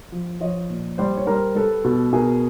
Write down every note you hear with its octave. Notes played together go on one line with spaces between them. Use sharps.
F3
F3 C#5 D#5
A#2
G3 C5 D5
C#5
G3 A#4 C5
G3 A4 B4
B2
B2 G#4 A#4